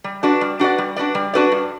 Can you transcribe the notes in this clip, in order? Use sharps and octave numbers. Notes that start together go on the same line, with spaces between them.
G3
D4 F#4 B4 D5
G3
D4 F#4 B4 D5
G3
D4 F#4 B4 D5
G3
D4 F#4 B4 D5
G2